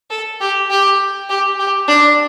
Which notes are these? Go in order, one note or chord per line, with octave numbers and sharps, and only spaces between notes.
A4
G4
G4
G4
G4
D4